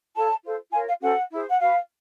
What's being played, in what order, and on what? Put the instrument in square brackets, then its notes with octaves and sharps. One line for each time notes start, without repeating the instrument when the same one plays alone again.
[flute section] F4 A4 C#5 A5
F4 A4 C5
F4 A#4 C#5 G#5
F5
C#4 F#4 A4 C5 F#5
E4 G#4 C5
F#5
F#4 B4 F5